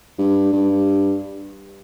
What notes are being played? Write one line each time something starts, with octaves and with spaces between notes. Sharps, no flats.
G2
G2